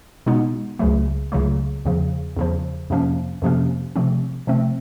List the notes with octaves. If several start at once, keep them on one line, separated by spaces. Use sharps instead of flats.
B2 G#3 B3 D#4
C#2 C#3 F#3 A3
C#2 C#3 F#3 A3
E2 C#3 F3
E2 C#3 F3
F2 C3 F3 A#3 C#4
F2 C3 F3 A#3 C#4
C3 F3 A3 C4
C3 F3 A3 C4